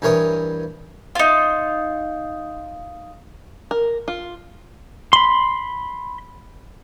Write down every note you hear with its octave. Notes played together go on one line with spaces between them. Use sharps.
G2 E3 A#4 C#5 D#6
D#4 F4
A#4
F4
B5 C6